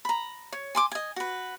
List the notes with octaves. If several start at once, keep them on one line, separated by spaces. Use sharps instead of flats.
A#5 B5
C#5
G#5 C6 D6
D#5 G#5
F#4 B4